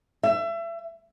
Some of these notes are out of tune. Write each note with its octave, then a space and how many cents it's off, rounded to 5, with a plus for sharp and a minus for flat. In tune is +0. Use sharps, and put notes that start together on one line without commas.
E5 +30